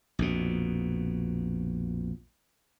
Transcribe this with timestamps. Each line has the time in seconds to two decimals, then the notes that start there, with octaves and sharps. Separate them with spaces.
0.19 A#1 F2 B2